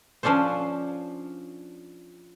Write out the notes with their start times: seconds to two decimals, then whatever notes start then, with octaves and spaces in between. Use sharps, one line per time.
0.23 F3 C#4 D4 A4 C5